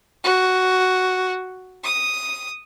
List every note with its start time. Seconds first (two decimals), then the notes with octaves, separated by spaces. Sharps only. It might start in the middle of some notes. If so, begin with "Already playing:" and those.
0.24 F#4
1.84 D#6